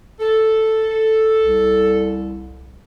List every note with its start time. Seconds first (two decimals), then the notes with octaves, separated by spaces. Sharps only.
0.19 A4
1.38 C2